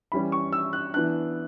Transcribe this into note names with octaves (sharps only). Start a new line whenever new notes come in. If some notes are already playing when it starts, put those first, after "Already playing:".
E3 G3 C#4 B5
C#6
E6
F#6
E3 B3 D4 F#6